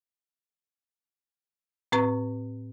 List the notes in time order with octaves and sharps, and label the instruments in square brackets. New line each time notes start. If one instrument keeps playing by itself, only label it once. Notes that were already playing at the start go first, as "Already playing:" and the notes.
[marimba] A2 C4 B4 C#6